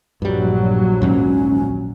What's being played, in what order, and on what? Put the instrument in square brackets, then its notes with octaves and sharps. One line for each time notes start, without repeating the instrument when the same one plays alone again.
[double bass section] A#1 F#3 [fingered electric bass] G2 G3
[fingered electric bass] D#2 G#2 [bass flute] C#4